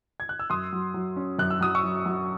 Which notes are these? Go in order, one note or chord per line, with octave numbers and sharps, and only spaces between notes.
G#6
F#6
E6
F#2 C6 D#6
F#3
F#3
C#4
F#2 F#6
E6
F#3 D#6
C#6 E6
F#3
F#3